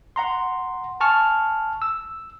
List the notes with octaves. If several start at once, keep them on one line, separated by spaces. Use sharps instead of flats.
F#5 A#5 C6
G#5 A5 C#6 F6
E6